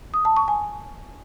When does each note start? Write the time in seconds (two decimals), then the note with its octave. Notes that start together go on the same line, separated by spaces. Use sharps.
0.14 D#6
0.25 A5
0.37 C#6
0.48 G#5